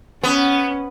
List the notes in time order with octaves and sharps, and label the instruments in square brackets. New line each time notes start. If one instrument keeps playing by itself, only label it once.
[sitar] B3 [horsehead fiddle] C#4